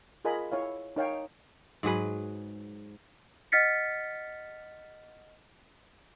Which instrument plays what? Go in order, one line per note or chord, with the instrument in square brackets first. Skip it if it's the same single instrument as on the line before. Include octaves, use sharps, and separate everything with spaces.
[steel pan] F4 G#4 A#4 D#5 G#5 B5
E4 C#5 F5
D#4 A#4 C#5 F5 G5 A5
[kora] G#2 F#3 G#4 B4
[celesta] D#5 F#5 F6 A6 B6 C#7